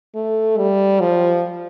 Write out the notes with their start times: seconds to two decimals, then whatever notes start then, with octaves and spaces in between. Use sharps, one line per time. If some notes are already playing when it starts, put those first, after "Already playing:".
0.15 A3
0.57 G3
1.00 F3